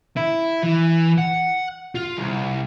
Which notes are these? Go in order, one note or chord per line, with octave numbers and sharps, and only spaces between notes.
E4
E3
F#5
F4
C2